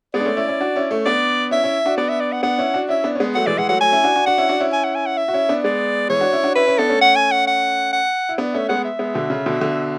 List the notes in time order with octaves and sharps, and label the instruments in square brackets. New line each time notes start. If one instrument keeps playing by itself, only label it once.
[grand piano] G#3 B3 [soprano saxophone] D5
[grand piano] D4
A3 C#4
C#4 E4
C#4 E4
D4 F#4
C#4 E4
A3 C#4
[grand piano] B3 D4 [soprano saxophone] D5
[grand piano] C#4 E4 [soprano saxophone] E5
[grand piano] C#4 E4
D4 F#4
[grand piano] B3 D4 [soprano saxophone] D5
[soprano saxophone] E5
D5
F#5
[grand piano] B3 D4 [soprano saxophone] F#5
[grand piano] C#4 E4
D4 F#4
[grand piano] C#4 E4 [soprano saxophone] E5
[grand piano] B3 D4
C#4
G#3 B3
[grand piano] F#3 A3 [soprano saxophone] F#5
[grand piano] E3 G#3 [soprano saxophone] D5
[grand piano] E3 G#3 [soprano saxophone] F#5
[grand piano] F#3 A3 [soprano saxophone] F#5
[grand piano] F#3 A3 [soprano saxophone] G#5
[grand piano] C#4 E4
D4 F#4
D4 F#4
[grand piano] D4 F#4 [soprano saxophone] F#5
[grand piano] C#4 E4
D4 F#4
C#4 E4
[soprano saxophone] G#5
F#5
G#5
F#5
E5
[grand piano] F#4
C#4 E4
B3 D4
[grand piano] G#3 B3 [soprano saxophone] D5
[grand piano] E3 G#3 [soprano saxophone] C#5
[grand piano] D4 F#4
C#4 E4
D4 F#4
[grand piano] C#4 E4 [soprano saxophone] B4
[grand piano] C#4 E4
[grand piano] B3 D4 [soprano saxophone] A4
[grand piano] A3 C#4
[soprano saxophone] F#5
G#5
F#5
F#5
F#5
[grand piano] E4
B3 D4
[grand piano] A3 C#4 [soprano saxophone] E5
[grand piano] G#3 B3 [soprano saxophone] F#5
[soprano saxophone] E5
[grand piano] G#3 B3
B2 D3
C#3
B2 D3
B2 D3